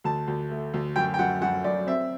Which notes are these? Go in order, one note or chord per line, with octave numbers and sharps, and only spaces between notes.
D2 A5
D2
A3
D2
F#2 G5
G5
F#2 F#5
F#2 F#5
F#2 D5
C4 E5